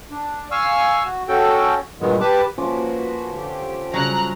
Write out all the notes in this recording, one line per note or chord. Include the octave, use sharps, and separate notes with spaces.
D4
F5 G#5 C#6 E6 F6
F#4
C#4 F#4 A4 G5
G2 A#2 D#3 F#3 G#3 B3
G4 B4 A5 D6
F3 A#3 C#4 F#4 B4 D6
D3 G4
C#3 F#3 G3 A#5 F#6